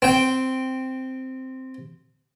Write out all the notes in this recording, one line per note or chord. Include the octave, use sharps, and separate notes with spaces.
C4 G5